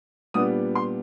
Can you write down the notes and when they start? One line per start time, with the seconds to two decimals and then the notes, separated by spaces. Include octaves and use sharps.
0.34 A#2 G3 B3 D4 D#6
0.75 C6